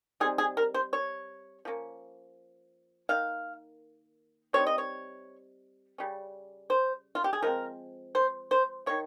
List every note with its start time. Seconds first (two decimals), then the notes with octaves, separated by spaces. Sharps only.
0.20 G3 C4 D#4 G#4
0.38 G#4
0.57 A#4
0.74 C5
0.93 C#5
1.65 F3 A#3 C#4
3.09 D#3 A#3 F5
4.53 G3 C4 D#4 C#5
4.67 D#5
4.78 C#5
5.98 C#3 G3 C#4
6.70 C5
7.15 F4
7.24 G4
7.33 G#4
7.42 F3 G#3 C4 A#4
8.15 C5
8.51 C5
8.86 D#3 A#3 C#5